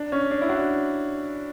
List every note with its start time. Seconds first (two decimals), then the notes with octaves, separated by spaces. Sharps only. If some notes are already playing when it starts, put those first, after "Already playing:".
Already playing: D4
0.12 C#4
0.31 D4
0.41 E4
0.49 D4 F#4